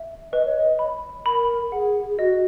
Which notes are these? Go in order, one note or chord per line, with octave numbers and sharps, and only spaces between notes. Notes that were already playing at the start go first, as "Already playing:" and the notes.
Already playing: E5
B4 D#5
C#5
D#5
B5
A#4 B5
G#4 F#5
G#4
F#4 D#5